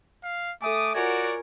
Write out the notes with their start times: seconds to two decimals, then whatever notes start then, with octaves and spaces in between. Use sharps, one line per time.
0.24 F5
0.62 A3 A4 E5 G#5 D6 D#6
0.94 F4 F#4 A#4 C#5 D5 G#5 G#6